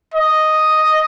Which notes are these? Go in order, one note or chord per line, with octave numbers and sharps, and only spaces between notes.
D#5